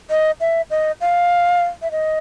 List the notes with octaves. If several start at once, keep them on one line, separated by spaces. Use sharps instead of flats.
D#5
E5
D#5
F5
E5
D#5